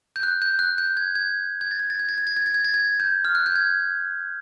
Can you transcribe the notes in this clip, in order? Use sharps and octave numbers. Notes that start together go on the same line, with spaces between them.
G6
F#6
G6
F#6
G6
G#6
G#6
G#6
A6
G#6
A6
G#6
A6
G#6
A6
G#6
A6
G#6
A6
G#6
G6
F6
F#6
G6
G#6